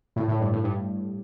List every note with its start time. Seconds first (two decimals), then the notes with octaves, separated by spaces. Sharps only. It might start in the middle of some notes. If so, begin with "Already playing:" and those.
0.16 A2
0.28 A2
0.41 G2
0.52 A2
0.64 G2